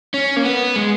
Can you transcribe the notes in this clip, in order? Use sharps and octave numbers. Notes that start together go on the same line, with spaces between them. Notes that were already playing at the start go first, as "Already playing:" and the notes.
C#4
A#3
B3
G#3